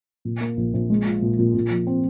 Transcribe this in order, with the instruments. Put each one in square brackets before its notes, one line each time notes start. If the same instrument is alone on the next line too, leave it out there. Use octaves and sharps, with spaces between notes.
[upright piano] A#2
A#3
A#1
A#1
G#3
F4
A#2
A#2
A#2
F3
C4